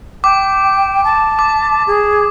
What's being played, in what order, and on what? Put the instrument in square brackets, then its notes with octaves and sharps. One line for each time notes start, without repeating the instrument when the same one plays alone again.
[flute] G5 [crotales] D6
[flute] A5
[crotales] D6
[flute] G#4